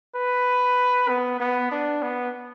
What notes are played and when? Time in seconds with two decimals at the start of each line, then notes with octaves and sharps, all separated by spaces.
0.16 B4
1.09 B3
1.40 B3
1.71 D4
2.02 B3